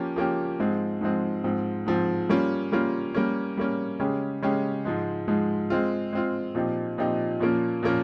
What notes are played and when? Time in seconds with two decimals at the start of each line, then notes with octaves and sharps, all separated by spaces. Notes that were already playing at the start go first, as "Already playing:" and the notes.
Already playing: F3 A#3 C#4 G4
0.16 F3 A#3 C#4 G4
0.59 G#2 F3 G#3 C4
1.01 G#2 F3 G#3 C4
1.44 G#2 F3 C4
1.86 G#2 F3 C4
2.29 G3 A#3 C#4 F4
2.72 G3 A#3 C#4 F4
3.15 G3 A#3 C#4
3.57 G3 A#3 C#4
4.00 C#3 G#3 C#4 G4
4.42 C#3 G#3 C#4 G4
4.85 G#2 F3 G#3
5.28 G#2 F3 G#3
5.70 G#3 C4 F4
6.13 G#3 C4 F4
6.55 A#2 F3 C4 D#4 G4
6.98 A#2 F3 C4 D#4 G4
7.40 A#2 F3 A#3 C#4
7.83 A#2 F3 A#3 C#4